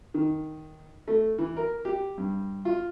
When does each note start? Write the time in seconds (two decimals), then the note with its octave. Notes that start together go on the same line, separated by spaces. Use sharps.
0.14 D#3
1.08 A3
1.38 E3
1.57 A#4
1.85 G4
2.18 G2
2.65 F4